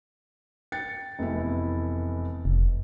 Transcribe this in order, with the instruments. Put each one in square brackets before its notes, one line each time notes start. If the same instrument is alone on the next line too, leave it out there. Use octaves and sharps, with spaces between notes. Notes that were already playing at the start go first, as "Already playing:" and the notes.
[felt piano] G5 A6 C#7
F1 E2 E4
[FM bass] F1